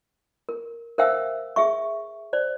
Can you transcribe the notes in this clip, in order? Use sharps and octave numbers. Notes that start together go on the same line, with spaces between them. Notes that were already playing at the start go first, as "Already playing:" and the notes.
A#4
A#4 C5 E5 F5 G5 E6
G#4 E5 C#6
C5 D5